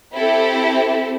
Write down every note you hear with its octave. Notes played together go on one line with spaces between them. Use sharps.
C4 E4 G4 A4